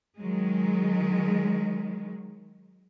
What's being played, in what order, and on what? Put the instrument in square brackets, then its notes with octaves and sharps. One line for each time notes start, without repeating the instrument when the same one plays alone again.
[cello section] D#3 F#3 G#3